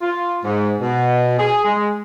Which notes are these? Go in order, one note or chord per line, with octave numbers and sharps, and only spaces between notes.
F4
G#2
B2
G#4
G#3